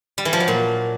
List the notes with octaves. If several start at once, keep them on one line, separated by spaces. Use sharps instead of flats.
G3
E3
F3
F#3
A#2